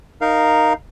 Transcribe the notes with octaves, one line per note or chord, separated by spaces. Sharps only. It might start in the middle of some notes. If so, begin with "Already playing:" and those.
D#4 A#4 F5